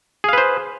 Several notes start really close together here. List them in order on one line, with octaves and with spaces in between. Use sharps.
G#4 F5 B4 C5